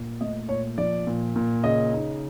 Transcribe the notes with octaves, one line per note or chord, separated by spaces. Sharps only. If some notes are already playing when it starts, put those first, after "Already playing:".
Already playing: A#2
A3 D#5
A#2 C#5
F3 D5
A#2
A#2
C#3 D#5
D#4